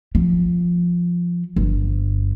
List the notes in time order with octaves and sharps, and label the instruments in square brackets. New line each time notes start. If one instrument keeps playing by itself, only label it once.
[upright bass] F3
G1